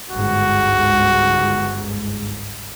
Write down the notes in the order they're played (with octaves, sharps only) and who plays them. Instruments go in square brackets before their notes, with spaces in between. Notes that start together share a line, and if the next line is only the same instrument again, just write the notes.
[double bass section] G1 C#2 G#2 [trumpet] F#4